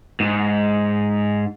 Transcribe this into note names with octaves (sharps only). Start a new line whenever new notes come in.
G#2